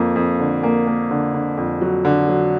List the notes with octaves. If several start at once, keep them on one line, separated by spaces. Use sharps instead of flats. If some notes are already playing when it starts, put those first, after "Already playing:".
Already playing: F2 A#3
F2
D3
A#3
A#3
D3
D3
F2
F#3
D3
F#3